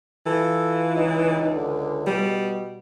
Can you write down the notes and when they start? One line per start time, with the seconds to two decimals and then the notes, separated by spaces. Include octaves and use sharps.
0.27 E3 F4 A4
0.96 C#2 D#4
1.54 D3
2.07 B2 G3